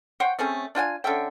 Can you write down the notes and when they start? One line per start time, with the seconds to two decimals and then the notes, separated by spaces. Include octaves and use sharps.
0.20 C5 C#5 F#5 G5
0.39 A3 C4 C#4 G#4
0.75 D4 F4 G5 G#5
1.04 D3 C#4 E5 G5